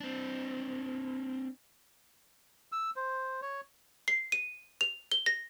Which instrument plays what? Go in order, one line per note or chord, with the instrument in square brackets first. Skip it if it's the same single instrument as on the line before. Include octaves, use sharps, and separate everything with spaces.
[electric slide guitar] C4 D4
[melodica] E6
C5
C#5
[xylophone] C7
D#7
F7
G7
A#6